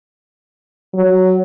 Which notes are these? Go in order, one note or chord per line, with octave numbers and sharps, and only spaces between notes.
F#3